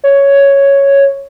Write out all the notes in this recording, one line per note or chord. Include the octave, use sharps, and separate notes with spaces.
C#5